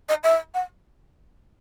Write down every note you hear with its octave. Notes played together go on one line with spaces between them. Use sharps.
D#5
E5
F#5